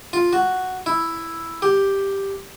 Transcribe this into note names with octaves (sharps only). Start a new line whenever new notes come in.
F4
F#4
E4
G4